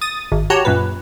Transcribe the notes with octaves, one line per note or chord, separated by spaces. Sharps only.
D#6 A6 D#7
G#1
F#4 G4 C#5 F#5 A5 A#5
F#2 A#2 B4